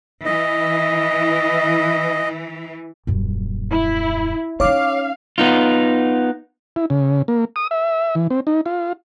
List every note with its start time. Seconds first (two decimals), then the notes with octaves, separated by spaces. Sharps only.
0.26 E3 D#5
3.07 D#1 F#2
3.72 E4
4.60 C#4 D#4 C#5 F5 D6
5.38 B3 D#4 F4
6.76 E4
6.90 C#3
7.28 A#3
7.56 D#6
7.71 E5
8.15 E3
8.30 C4
8.47 D#4
8.66 F4